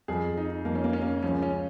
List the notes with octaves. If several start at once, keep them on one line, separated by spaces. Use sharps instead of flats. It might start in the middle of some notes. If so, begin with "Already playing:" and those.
F2 F3 G#4
D#4
F2 F3 A#3
C#4
A#3
C#4
A#3
C#2 C#3 F3 C#4
C#4